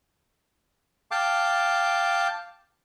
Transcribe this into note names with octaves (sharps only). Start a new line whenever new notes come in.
F5 G5 A5 D6